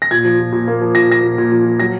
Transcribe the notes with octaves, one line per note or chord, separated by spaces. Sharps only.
A#6
A#2 G#6
F3
A#2
A#2
A#3
F3
A#2 A#6
F3 A#6
A#2
A#2
F3
F3
F#3 A#6